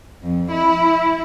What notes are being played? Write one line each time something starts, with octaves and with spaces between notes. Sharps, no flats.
F2
E4